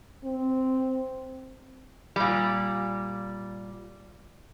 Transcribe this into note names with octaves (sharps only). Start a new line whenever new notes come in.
C4
A#2 G3